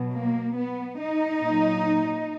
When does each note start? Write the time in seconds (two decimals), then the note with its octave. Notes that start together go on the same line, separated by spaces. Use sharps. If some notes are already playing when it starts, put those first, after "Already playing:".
Already playing: B2 F#3
0.12 A#3
0.56 B3
0.99 D#4
1.43 A#2 F#3